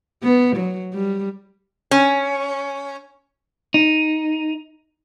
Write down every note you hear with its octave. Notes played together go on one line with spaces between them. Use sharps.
B3
F#3
G3
C#4
D#4